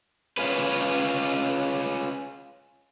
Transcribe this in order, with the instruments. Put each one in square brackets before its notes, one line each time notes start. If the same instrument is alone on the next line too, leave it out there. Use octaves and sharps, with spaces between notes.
[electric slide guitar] C#4 F4 G#4 B4